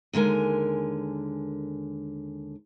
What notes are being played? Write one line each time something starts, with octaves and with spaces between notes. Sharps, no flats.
D#2 D3 G#3 A#4 G#5